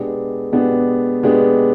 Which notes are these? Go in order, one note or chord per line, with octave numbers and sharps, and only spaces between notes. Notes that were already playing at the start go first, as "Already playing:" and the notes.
Already playing: B2 G#3 B3 D4 G4
B2 G#3 B3 D4 G4
B2 G#3 B3 D4 G4